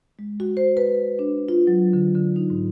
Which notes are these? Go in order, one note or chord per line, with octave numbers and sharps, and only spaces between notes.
G#3
F#4
C5
B4
D4
F4
F#3
D3
D3
D#4
G#2